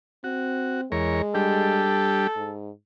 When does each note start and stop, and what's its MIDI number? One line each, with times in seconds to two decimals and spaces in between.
0.24 0.86 60
0.24 0.81 66
0.92 1.22 40
0.92 1.85 56
0.92 1.22 70
0.92 1.22 73
1.35 2.27 55
1.35 2.27 62
1.35 2.27 67
1.35 2.54 69
2.36 2.70 44